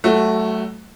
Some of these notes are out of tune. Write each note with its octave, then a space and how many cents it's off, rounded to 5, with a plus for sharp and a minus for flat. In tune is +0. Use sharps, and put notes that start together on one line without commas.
F#3 +40 A3 +0 F#4 +5